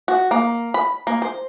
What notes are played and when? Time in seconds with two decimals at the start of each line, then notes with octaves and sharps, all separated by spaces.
0.08 F#4
0.31 A#3
0.74 B5
1.07 A#3
1.22 C5